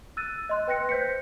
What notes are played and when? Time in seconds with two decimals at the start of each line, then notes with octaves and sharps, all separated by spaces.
0.17 E6 F#6 A6 D#7
0.49 D#5 C6 F#6
0.67 B4 G5 F#6 A#6 C#7
0.89 C5 G6 B6 C#7